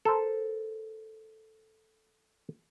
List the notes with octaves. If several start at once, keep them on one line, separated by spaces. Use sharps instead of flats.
A4 A#4 C5